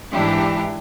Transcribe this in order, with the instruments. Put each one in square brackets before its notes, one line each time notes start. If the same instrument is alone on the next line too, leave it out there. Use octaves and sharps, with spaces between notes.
[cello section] G#2 E3 D4 E4 G4